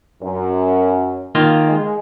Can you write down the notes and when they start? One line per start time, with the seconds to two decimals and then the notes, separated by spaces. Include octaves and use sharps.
0.22 F#2
1.35 D#3 A#3 F4
1.68 G#3